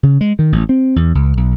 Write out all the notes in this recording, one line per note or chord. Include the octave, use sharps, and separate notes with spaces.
C#3
G#3
D#3
A1
C4
E2
C#2
B1